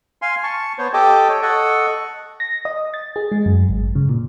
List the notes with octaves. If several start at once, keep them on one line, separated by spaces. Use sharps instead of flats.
F5 G#5 C6
A5 C#6
B3 C5 C#5
G4 A4 D#5 G5 A5 D6
C#5
A4 D#5 F#5 C#6
A#6
D#5
A6
G#4
G#3
F#2
G#1
C#3
A#2